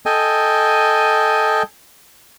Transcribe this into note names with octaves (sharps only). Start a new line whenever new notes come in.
A4 D#5 G5 G#5